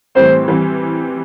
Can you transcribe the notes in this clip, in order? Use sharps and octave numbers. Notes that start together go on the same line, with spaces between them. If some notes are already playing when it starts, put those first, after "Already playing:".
A2 E3 G3 C4 C5
E3 G3 C4